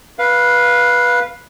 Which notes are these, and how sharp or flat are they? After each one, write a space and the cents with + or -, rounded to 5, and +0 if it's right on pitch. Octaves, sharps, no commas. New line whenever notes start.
B4 -15 F5 +0